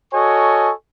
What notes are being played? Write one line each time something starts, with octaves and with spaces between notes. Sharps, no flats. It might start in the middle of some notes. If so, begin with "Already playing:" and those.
F#4 A4 C#5 D#5 G#5 C#6